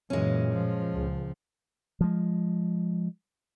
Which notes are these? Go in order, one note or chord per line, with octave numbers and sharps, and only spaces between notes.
F#2 A#2 E3 G#3 C#4
F3
C#2
F3 G#3